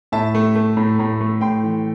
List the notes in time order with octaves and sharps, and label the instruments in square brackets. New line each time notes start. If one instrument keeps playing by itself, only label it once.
[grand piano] A2 E5 A5
A3
A3
A2
A2
A3
A2 G5 C6
E3